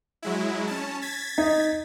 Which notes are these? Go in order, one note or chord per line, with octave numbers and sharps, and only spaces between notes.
F#3 G#3 E4
C#4 A5
G#6 A6 B6
D#4